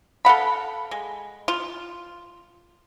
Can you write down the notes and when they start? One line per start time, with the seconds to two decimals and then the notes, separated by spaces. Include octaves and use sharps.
0.25 A4 F5 F#5 B5
0.91 G#3
1.48 F4